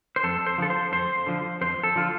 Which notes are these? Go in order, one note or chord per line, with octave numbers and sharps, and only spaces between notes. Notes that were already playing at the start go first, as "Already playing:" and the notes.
C5
F2 A4
C5
D3 F3 A4
C5
F2 C5
D3 F3
F2 C5
A4
D3 F3 F4